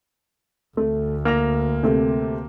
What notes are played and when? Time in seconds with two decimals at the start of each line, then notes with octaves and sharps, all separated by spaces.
0.77 D2 A3
1.25 A#3 F6 A#6 F7
1.83 C3 A3